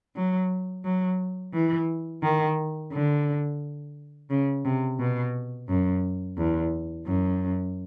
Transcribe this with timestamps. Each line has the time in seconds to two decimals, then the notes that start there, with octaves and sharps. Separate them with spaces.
0.16 F#3
0.84 F#3
1.53 E3
2.23 D#3
2.92 D3
4.30 C#3
4.65 C3
4.99 B2
5.69 F#2
6.37 E2
7.06 F#2